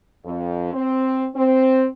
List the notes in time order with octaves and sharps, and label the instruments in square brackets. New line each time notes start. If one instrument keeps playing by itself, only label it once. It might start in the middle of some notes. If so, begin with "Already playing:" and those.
[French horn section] F2
C4
C4